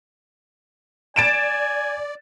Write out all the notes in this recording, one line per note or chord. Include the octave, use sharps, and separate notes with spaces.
D5 G#5 A6 D7 E7